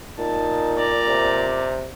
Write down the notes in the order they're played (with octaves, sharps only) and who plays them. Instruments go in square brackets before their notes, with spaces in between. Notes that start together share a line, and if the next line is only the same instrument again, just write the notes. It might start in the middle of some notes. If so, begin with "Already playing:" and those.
[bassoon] A#2 [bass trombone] D#4 [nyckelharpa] A5
[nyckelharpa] D5 A#5
[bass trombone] C3